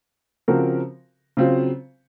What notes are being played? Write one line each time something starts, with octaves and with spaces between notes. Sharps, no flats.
C#3 F3 C4 F#4 A#4
C#3 F#3 C4 F4